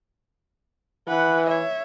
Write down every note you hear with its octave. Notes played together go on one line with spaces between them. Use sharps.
E3 B4 F#5
C#5 E5